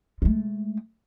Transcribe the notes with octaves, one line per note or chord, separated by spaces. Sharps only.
G#3 A3